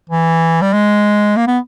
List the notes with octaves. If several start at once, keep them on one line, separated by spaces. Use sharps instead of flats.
E3
G3
G#3
A#3
B3